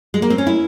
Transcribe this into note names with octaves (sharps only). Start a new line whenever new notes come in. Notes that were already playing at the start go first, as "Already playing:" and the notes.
G#3
A#3
C4
C#4
E4